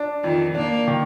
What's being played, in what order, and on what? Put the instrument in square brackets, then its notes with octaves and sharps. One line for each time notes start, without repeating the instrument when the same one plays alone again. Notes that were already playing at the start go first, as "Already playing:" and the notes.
Already playing: [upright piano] D4
[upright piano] F2 [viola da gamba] D#3
[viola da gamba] A#3 [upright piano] D4
[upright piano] D#3